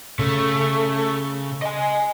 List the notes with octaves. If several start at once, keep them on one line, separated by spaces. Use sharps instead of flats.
C#3 A3
D#5 G#5